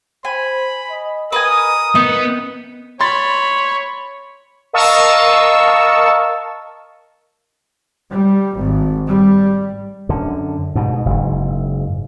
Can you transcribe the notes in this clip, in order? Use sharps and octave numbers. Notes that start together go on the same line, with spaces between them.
C5 G#5 B5
D#5
A#4 B4 D#5 G#5 D#6
B3 D#4
C#5 B5 C6 A6
A#4 D#5 F5 A5 C#6 E6
G3
G#1
G3
F#2 D3
G#2 B2
F#1 G#2